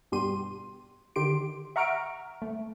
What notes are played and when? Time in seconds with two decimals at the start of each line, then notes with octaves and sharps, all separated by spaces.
0.12 G2 B2 G3 G4 C6 D#7
1.16 D3 D#3 G4 C6 D7
1.76 E5 F#5 A#5 C#6 F6 D7
2.42 A3